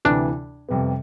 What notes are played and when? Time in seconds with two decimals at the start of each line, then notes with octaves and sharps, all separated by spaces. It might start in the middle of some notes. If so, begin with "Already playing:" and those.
0.05 D2 C3 E3 D4
0.69 F2 C3 G3 B3